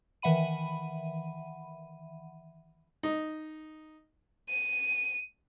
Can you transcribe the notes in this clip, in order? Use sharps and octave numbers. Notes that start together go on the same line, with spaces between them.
D#3 E3 E5 F#5 B5 D#7
D#4
D#7